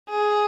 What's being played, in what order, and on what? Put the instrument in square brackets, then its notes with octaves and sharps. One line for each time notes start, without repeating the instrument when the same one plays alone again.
[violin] G#4